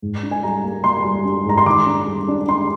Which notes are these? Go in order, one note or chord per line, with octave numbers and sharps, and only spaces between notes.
G#2
D4
G#5
G3 A#5
A#3
A#3 C6
G3
D4
G#2 A#5
C6
D#3 D6
D4
G3
D4
D4 C6